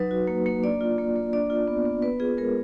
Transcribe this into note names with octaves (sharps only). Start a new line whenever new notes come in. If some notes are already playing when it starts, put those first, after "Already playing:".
Already playing: F#3 D#4 B4
F#4
A#3
A#3
D4 D5
F4
A#3
A#3
D4 D5
F4
B3
B3
B3 B4
F4 G#4
G#3 A#4